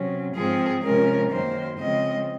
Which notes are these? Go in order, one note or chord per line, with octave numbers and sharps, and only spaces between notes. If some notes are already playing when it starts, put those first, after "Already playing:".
Already playing: C3 F#3 C#4
G#2 F3 C4 G#4
C3 F3 G#3 C#4 A#4
F#2 D#3 F#3 A#3 C5
C#3 F3 G#3 C4 D#5